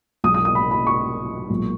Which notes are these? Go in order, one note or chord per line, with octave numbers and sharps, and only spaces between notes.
B1 B2 G#3 D#6
D#6
D#6
B5
B5
C#6
B1 A#2 G#3